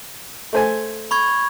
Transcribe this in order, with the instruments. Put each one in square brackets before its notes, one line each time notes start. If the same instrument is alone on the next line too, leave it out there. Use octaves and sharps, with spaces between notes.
[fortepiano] A3 C5 G#5
[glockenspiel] B5 C#6 G#6